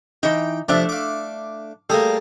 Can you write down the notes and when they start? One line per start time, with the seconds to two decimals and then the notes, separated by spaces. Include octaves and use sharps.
0.23 E3 D#4 G5
0.69 C3 F3 A3 D4 D5 E5
0.89 F5 D6
1.90 G3 A3 A#3 G#4 A4